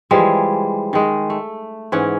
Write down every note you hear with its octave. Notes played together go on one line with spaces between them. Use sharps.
E3 F3 G3 G#3
D#3 G#3
A3
G#2 E3 C#4 F#5